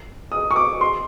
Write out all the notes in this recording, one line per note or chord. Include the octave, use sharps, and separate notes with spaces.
D#6
C#6
D6
C6